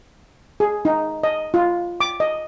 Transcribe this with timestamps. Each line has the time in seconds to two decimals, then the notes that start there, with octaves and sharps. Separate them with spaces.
0.60 G#4
0.85 D#4
1.23 D#5
1.54 F4
2.01 D6
2.20 D#5